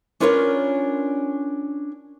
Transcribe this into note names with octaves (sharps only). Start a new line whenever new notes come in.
C#4 D4 F4 A#4 B4 C#5